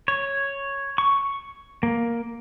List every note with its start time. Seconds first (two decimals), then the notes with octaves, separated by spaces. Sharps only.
0.08 C#5
0.98 C#6
1.83 A#3